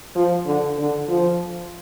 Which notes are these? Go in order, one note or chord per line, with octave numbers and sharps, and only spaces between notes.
F3
D3
D3
F3